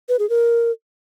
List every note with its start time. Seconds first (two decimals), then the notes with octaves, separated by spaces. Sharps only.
0.09 B4
0.19 G#4
0.30 A#4